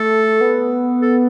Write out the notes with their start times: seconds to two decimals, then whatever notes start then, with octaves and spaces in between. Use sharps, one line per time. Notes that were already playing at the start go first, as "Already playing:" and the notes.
Already playing: A3 A4
0.41 B3
1.02 A4